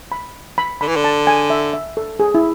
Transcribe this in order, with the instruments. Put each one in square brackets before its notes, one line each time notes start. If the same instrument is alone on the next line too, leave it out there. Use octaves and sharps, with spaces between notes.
[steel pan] B5
B5
[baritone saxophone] D3 [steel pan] B5
[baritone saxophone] E3
D3
[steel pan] A5
G#5
E5
E5
A4
G#4
E4